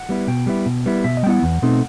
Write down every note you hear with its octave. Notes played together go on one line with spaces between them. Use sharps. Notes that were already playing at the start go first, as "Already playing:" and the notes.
Already playing: F#5
G3 B3 E4
B2 G5
G3 B3 E4
B2
G3 B3 E4
B2 E5
D#5
G3 B3 E4 F#5 G5
E2
B2 A3 C4 D#4